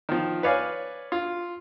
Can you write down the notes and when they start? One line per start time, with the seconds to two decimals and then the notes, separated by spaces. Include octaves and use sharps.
0.09 D#3 F3
0.43 B4 C#5 D5 F5 G#5
1.12 F4